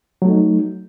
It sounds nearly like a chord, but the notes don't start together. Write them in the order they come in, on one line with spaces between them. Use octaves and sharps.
F#3 A3 D#4